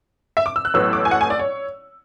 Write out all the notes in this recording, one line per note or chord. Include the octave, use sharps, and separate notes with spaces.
E5
D6
E6
F#6
A1 A2 F#3 B3 E6
D6
G#5
F#5
G#5
D5
C#5